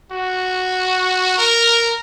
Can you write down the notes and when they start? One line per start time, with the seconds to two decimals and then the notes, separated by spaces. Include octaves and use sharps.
0.12 F#4
1.38 A#4